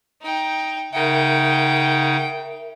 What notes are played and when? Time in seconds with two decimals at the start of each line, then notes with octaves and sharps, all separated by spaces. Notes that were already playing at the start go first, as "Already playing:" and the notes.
0.22 D#4 G5
0.93 C#3 D#4 A#4 E5 F#5 G5